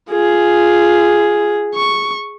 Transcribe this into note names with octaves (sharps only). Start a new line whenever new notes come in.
F4 G#4
C#6